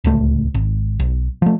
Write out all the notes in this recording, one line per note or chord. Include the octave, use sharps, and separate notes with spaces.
D1 C#2 A3
G#1
B1
F3 A3